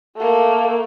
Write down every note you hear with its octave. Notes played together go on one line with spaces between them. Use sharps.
A3 A#3